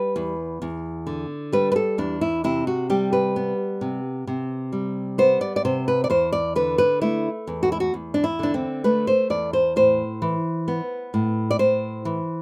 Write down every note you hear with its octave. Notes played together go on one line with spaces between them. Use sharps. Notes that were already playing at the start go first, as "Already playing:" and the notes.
Already playing: G3 B4
E2
E2
D3
G3 B4
B4
A4
E2 D4
E4
C3 E4
F#4
G3 G4
B4
B3
C3
C3
G3
B3 C5
D5
D5
C3 C5
B4
D5
E2 C5
D5
D3 B4
B4
A3 E4
E2
F#4
E4
F#4
E2
D4
E4
D3 D4
C4
A3 B4
C5
E2 D5
C5
A2 C5
E3
B3
A2
D5
A2 C5
E3